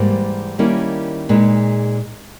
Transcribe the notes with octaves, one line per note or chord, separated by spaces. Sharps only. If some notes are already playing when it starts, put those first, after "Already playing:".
Already playing: G#2 E3 G3 A#3
D#3 G3 A#3 C#4 E4
A#2 G#3 D#4 G#4 B4